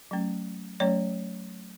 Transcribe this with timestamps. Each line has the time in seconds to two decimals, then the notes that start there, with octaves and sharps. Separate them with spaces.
0.11 F#3 A3 C#4
0.80 F#3 A3 C#4 C#5